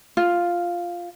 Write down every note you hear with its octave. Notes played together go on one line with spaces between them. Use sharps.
F4